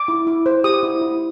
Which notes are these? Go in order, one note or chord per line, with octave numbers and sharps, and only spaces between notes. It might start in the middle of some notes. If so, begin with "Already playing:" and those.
Already playing: D6
E4
E4
C5
G4 D#6
E4
E4